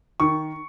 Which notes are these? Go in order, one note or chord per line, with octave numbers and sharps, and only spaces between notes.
D#3 C#6